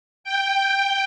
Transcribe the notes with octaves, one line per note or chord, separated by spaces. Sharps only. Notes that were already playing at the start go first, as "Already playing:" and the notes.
G5